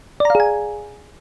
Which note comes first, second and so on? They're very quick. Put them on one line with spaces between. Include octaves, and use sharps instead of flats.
D5 A#5 F5 G#4 G#5